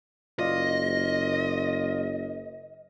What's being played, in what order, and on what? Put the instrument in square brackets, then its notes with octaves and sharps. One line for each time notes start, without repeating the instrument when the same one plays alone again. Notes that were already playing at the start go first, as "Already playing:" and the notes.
[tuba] F#1 [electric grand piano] F4 D5 F5 [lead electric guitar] D#5